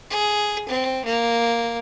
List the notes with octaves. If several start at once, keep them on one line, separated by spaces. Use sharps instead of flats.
G#4
C4
A#3